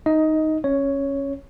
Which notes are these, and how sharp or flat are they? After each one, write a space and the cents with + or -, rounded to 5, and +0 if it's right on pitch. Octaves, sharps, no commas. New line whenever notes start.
D#4 +0 D#5 +15
C#4 -15 C#5 +5